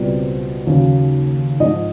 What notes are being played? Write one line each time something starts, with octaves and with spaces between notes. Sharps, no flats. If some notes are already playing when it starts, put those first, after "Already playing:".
Already playing: C#2 B2 G3 C4
D#2 C#3 F#3
G#2 F3 G#3 D#5